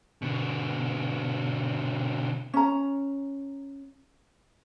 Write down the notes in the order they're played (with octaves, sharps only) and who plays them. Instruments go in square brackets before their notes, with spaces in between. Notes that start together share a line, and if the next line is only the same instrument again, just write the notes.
[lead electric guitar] B2 D3
[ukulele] C#4 A#5